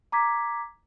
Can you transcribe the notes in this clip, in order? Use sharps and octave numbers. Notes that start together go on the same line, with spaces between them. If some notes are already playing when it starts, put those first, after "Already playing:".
A#5 D6 G#6 B6